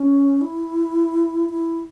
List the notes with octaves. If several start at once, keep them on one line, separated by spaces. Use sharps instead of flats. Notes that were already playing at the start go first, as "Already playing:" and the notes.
Already playing: C#4
E4
E4